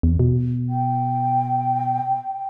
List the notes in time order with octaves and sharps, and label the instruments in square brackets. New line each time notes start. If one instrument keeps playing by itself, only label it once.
[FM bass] E2
B2
[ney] G5